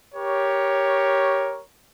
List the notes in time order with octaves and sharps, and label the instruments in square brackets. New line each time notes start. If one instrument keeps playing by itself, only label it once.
[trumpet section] G4 A#4 C#5